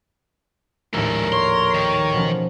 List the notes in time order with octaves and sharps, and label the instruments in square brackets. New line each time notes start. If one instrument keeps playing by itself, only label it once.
[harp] A#1 D#2 A2 [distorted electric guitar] G#3 A4 [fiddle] A#4
[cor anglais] C#5 [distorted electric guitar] C6
[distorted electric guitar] D#3
[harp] B2 F3 C#4